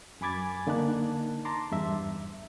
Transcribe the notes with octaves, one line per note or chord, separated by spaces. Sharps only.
F#2 G#5 B5 D6 G#6 A6
D3 A#3 D#4 A5 F#6
A5 A#5 C6 D6
E2 G2 E5